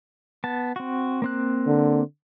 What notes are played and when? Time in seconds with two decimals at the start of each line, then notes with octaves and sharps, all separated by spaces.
0.44 B3 A5
0.76 C4 F#4
1.22 A#3 C4 F#6
1.67 D3